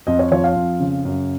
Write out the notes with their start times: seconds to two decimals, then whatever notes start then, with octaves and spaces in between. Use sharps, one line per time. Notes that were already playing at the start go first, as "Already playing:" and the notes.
0.07 F2 D#5
0.19 C#5
0.31 F3 C#5
0.44 F5
0.56 F2
0.80 C#3
1.05 F#2